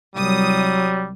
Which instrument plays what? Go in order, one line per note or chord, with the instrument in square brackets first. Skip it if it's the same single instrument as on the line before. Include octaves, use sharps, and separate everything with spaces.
[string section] C2 D#6 [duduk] F#3 [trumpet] G3